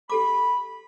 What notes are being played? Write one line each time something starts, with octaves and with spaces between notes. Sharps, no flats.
G4 A4 B5 D6